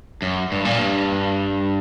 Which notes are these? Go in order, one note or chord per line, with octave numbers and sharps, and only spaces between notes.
F#2
G2
A#2
G2